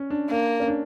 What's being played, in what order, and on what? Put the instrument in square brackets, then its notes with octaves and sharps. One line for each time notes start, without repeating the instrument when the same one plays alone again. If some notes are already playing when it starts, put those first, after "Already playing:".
Already playing: [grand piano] C#4
D4
[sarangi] A#3
[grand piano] C#4
D4